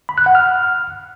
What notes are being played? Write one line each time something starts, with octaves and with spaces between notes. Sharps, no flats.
B5
F#6
F#5
F6